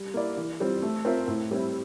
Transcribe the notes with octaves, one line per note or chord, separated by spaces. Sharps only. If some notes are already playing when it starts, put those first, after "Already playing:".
Already playing: G3
A#3 E4 A#4 D5
E3
G3 C4 F4
A3
C4 F4 A#4 E5
A2
G3 C4 E4